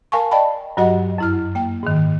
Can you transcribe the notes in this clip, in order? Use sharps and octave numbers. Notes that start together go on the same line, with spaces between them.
A#4 F5 G#5 A5 C#6
D5 D#5 F5 G5 A5 B5
G2 F#3 F#4 G4 D#5 F#5
F#2 E4 F6
A#3 G5
G#2 D#3